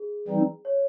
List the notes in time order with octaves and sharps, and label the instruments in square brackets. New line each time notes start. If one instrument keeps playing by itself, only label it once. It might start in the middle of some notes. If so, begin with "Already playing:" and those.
Already playing: [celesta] G#4
[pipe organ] E3 G3 C4 D#4
[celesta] C#5